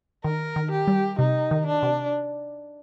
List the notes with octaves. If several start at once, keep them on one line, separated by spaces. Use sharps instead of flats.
D#3 A#4
D#3
G4
G3
C3 D#4
D#3
D4
C3